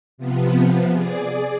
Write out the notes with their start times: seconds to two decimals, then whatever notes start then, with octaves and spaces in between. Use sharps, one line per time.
0.18 C3 F3 B3
0.91 G#4 D5